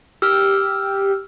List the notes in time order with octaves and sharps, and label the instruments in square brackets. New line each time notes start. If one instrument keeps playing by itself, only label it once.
[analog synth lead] G4 [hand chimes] E6 F6